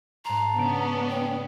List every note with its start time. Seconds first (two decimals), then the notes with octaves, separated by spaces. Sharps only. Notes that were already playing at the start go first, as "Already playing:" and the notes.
0.25 G#2 A5 A#5 C6
0.58 C#3 B3 C#4 D4 D7
1.10 G5